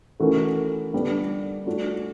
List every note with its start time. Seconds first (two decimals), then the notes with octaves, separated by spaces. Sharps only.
0.20 E3 A3 C#4 F#4 A#4
0.93 D3 G3 B3 D4
1.66 A3 D4 F#4